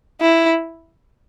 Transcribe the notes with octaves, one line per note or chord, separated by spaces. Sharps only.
E4